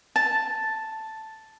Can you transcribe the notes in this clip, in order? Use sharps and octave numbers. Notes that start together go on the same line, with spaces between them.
A5